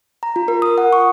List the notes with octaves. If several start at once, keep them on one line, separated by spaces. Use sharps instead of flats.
A#5
F4
A#4
D#6
F#5
C#6